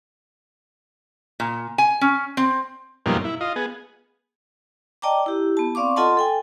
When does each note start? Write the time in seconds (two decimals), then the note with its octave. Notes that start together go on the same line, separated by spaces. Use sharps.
1.40 A#2
1.78 G#5
2.01 C#4
2.37 C4
3.06 F#2 B2 F3 G3 A#3 D#4
3.24 E4
3.41 F4 D#5
3.56 B3 G#4
5.02 D5 D#5 G5 A5 A#5 D6
5.26 E4 G4
5.57 B3 A5
5.75 C4 D5 F5 C#6 D6
5.96 F4 A4 D#5 F#5 A5 C6
6.17 A4 G5 G#5